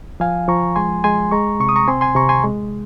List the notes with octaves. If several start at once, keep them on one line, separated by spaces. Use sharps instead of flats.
F3 F5 G#5
F3 A#5 C#6
G#3 G#5 C6
G#3 G#5 C6
G#3 A#5 C#6
C3 C#6
D#6
A#5 C#6
C4 G#5 C6
G#5 C6
C3 A#5 C#6
G#5 C6
G#3